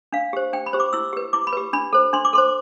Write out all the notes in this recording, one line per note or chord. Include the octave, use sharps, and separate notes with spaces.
D4 F5
G4 C5
D4 G5
B5
G4 C5
D6
E4 E6
G4 B4
E4 D6
B5
G4 B4
D4 B5
A4 C5
D4 C6
D6
A4 C5 C6